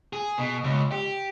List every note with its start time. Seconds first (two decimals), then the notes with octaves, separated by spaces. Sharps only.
0.13 G#4
0.38 B2
0.64 C#2
0.91 G4